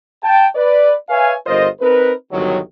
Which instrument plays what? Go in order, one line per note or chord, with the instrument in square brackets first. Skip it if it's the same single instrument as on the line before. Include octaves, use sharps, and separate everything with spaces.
[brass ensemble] G5 A5
B4 D5
B4 C#5 E5 F5 G#5
G1 F4 A#4 C5 D#5
C4 D#4 A#4 B4
G1 C2 D#3 F#3